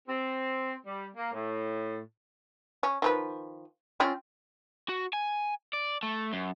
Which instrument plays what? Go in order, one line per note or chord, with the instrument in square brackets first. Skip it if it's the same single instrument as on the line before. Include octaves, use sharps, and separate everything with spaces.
[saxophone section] C4
G3
A#3
A2
[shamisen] C#4
D#3 F3 B4
C4 C#4 F4
[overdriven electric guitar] F#4
G#5
D5
A3
F#2